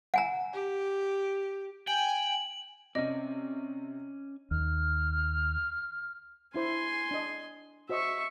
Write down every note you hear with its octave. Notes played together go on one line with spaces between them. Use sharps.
F#5 G#5 A#5
G4
G5 G#5 F#7
C3 C#4 D5 D#5
D#2 F6
D4 E4 C5 G#5 C6
D4 D#5
F#4 C5 D#5 E5 C#6